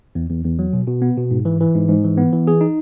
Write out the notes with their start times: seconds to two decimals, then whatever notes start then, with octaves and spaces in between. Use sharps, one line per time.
0.15 E2
0.29 E2
0.44 E2
0.59 F#3
0.73 B2
0.87 B2
1.02 B3
1.17 B2
1.31 G#2
1.45 E3
1.61 E3
1.75 G#2
1.88 G#2
2.04 E3
2.18 B3
2.33 E3
2.47 G#4
2.61 D#4